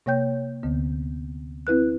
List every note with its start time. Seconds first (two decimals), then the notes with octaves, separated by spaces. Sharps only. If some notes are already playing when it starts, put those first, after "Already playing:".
0.06 C3 A#3 C#5 G5 G6
0.63 D2 D3 B3
1.67 C4 E4 B4 F#6